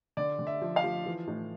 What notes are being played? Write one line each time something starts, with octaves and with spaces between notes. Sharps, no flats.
D3 D5
D3
E5
F3
F5
F3
E3
A2